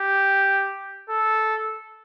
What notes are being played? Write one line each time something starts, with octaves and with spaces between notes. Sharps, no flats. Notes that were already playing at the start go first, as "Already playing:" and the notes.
Already playing: G4
A4